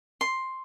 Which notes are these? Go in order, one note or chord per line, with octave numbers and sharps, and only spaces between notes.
C6